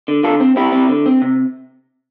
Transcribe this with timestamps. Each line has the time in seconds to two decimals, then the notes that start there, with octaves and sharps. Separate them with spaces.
0.08 D3
0.23 D3 F4 A4
0.40 C4
0.56 C4 E4 G4
0.72 C4
0.89 D3
1.06 C4
1.22 C3